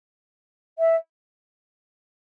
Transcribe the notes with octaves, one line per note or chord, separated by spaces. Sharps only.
E5